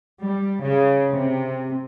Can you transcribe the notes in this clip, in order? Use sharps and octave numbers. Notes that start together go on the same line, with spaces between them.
G3
C#3
C3